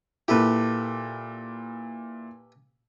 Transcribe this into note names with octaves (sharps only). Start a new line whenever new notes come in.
A#2 E4 G4 A4 B4